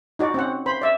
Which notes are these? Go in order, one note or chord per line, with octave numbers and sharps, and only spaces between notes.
D#4 F#4 D5
C4 C#4 F#5
C5 B5
D5 E5